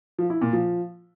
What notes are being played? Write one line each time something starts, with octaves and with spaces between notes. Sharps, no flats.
F3
E4
A#2
F3